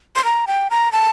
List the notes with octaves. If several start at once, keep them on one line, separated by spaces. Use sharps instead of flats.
C6
A#5
G5
A#5
A5